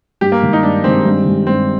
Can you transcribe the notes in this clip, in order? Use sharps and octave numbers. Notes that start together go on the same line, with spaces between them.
G2 G4
A#3
D#3 G#3
D#4
G2 D4
D#3 G#3 C4
G2
D#3 G#3
G2 C4